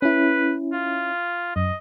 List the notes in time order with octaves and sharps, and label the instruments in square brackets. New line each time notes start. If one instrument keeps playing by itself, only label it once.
[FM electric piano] C#4 E4 [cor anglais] B4
[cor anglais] F4
[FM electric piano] F#2 [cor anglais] D#5